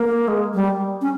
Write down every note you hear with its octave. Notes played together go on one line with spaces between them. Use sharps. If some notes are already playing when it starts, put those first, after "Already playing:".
Already playing: A#3
G#3
G3
C#4